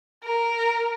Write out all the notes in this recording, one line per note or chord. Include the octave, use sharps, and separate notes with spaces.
A#4